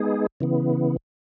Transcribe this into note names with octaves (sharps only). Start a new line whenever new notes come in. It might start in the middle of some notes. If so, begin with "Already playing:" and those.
Already playing: G#3 B3 D#4 G#4
C#3 E3 B3